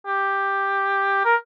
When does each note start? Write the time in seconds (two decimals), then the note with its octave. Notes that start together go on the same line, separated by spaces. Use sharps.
0.06 G4
1.24 A#4